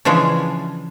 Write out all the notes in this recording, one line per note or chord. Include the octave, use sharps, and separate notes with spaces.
C#3 E3 F3 G#3 D4